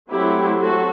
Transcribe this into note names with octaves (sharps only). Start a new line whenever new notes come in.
F#3 A3 C4 E4 G4
F#4 A4